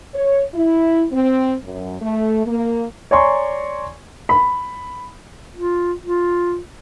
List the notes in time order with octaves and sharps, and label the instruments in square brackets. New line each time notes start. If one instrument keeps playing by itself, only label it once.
[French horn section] C#5
E4
C4
F#2
A3
A#3
[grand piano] C#5 D5 G#5 A#5 C6 C#6
[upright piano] B5
[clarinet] F4
F4